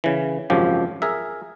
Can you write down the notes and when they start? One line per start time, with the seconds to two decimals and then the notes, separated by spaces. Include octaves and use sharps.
0.04 C#3 E3
0.50 G#1 F#2 C#3 F3 G4
1.02 G#4 A#4 E5